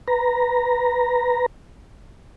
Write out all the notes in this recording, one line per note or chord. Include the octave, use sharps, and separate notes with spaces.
B4 A#5